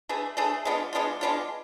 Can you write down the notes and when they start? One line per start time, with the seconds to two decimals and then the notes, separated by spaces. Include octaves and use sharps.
0.09 A3 D4 G#4 B4
0.37 A3 D4 G#4 B4
0.65 G#3 B3 D4 F4
0.93 G#3 B3 D4 F4
1.21 G#3 B3 D4 F4